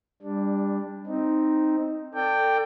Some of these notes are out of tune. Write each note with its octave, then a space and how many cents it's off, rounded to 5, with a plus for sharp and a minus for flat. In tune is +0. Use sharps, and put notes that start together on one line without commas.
G3 +25 D4 +0
C4 +0 D#4 +0
A4 +30 D5 +0 G5 +0